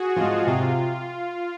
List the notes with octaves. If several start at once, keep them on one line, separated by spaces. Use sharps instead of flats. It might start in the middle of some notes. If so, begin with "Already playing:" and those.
Already playing: F#4 G#4
F3 G#3 F4
C3 F4